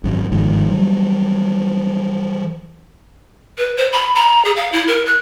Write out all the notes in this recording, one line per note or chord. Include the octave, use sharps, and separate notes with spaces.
G#1 F#2
G1 G#2 D#3 F3
E3 F#3 G3
B4
C5
B5
A#5
G#4
F5
E4
A#4
F#6